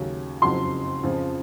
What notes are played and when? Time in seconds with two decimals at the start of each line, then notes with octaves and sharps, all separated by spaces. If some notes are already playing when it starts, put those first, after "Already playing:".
Already playing: D#2 C#3 F#3 C#4
0.42 F#1 F2 C#3 F#3 C6
1.03 F2 C#3 F3